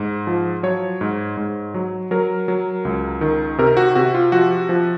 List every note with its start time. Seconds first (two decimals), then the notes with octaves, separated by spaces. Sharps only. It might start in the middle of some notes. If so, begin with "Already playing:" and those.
Already playing: G#2
0.27 F3
0.63 F#3 C#5
1.01 G#2
1.37 G#2
1.74 F#3
2.11 F#3 A#4
2.48 F#3
2.85 C#2
3.21 D#3
3.58 C3 A#4
3.77 F#4
3.95 C3 F#4
4.14 F4
4.32 F3 F#4
4.69 F3